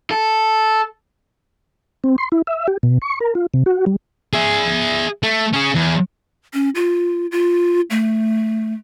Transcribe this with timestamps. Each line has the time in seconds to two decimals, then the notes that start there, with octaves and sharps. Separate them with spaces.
0.11 A4
2.04 C4
2.18 C6
2.32 E4
2.47 E5
2.68 G4
2.83 B2
3.02 C#6
3.20 A#4
3.35 F4
3.54 C3
3.66 F#4
3.86 G3
4.33 G#4 E5
5.23 A3
5.53 C#4 G#4
5.75 E2
6.54 C#4
6.75 F4
7.32 F4
7.90 A3